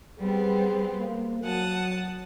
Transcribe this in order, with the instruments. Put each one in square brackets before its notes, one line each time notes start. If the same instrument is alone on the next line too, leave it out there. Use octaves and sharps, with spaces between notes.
[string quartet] G3 B3 C4 [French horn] G#4
[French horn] A#3
[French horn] F#3 [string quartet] F#5 A5 D#6